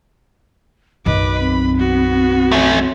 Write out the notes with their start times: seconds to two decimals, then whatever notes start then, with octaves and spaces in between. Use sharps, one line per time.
1.06 B1 F#2 B4 D#5 D6
1.40 C4 B5
1.78 B3 F#4
2.52 A3 C#4